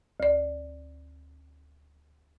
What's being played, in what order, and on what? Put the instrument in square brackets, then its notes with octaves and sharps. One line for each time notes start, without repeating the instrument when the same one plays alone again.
[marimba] D2 D5